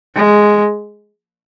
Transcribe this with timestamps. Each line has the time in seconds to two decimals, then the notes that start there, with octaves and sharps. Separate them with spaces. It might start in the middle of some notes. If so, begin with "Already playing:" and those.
0.16 G#3